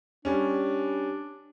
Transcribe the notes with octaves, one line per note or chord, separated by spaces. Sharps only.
G3 C#4 D4